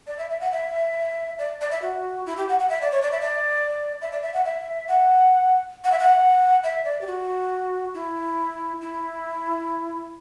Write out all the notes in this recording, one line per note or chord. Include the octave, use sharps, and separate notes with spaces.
D5
E5
E5
F#5
E5
D5
D5
E5
F#4
E4
G4
F#5
F#5
E5
D5
C#5
D5
E5
D5
E5
D5
E5
F#5
E5
F#5
F#5
E5
F#5
E5
D5
G4
F#4
E4
E4